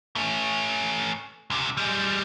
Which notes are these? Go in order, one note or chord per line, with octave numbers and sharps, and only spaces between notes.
A3 C#4
C#2 C3
G3 G#3